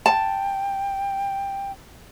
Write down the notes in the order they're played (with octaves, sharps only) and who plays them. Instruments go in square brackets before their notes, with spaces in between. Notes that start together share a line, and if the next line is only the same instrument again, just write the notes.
[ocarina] G5 [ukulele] A5